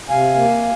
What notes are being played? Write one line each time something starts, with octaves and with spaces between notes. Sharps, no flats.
C3 F5 G#5
A#3